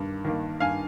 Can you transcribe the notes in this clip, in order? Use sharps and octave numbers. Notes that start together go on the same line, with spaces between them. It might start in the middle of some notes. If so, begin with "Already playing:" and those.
Already playing: G2 D#3 A#3
D#3 A#3
G2 F5 G#5